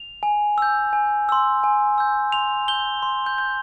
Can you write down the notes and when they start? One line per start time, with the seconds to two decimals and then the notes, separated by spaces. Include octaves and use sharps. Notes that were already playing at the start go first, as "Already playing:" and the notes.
Already playing: F7
0.23 G#5
0.58 E6 G6
0.93 G#5
1.29 C6 E6
1.64 G#5
1.98 E6 G6
2.32 C6 F7
2.68 G6 G7
3.02 C6
3.26 G6
3.38 G6